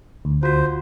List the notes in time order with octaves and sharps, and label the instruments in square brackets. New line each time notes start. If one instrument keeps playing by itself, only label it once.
[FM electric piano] D2
[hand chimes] F4 F#4 [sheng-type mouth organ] C5